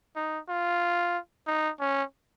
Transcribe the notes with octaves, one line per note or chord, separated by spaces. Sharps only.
D#4
F4
D#4
C#4